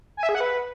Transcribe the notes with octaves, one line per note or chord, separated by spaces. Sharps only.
G#5
E5
G#4
F#5
B4